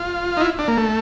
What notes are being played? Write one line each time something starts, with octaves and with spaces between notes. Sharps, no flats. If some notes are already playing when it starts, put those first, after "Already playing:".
Already playing: F4
D#4
E4
D4
A#3
A3